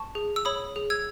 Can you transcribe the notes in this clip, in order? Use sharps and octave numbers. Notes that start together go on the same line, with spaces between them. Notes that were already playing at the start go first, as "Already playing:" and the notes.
Already playing: A5 C#6
G#4
E6
C#5 B5 D#6
G#4
E6 G#6